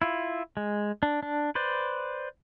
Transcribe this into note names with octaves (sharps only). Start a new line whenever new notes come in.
E4 F4
G#3
D4
D4
B4 C5 D5